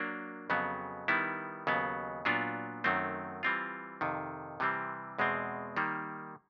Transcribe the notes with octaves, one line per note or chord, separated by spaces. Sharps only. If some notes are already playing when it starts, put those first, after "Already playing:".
Already playing: F#3 A#3 D4
F2 C#3 F#3 B3
D#3 G3 B3 E4
D#2 C#3 F#3 B3
A#2 F#3 B3 D4 F4
F#2 D#3 F#3 A3 C4
E3 G3 C4 F4
F2 C3 D#3
C3 E3 G3 C4
E2 B2 G#3 C4
D#3 G3 A#3